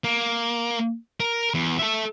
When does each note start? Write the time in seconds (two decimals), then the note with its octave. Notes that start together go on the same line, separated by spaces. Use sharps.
0.04 A#3
1.20 A#4
1.54 E2
1.79 A4 E5